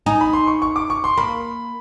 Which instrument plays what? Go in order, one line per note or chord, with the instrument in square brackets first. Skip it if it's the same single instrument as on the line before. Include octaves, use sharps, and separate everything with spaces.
[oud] D#4 [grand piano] G#5
[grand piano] B5
C6
C#6
C#6
D6
C#6
C6
[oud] A#3 [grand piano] B5